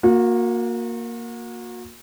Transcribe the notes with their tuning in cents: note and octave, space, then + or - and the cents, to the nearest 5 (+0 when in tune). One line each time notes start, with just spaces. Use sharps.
A#3 +0 F#4 -35